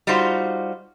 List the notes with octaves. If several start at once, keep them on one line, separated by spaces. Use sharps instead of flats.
G3 D#4 F4 F#4 C5